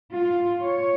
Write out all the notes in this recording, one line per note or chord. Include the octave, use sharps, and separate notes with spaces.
F4
C#5